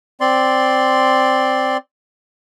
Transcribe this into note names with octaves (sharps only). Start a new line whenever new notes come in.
C4 D5 C6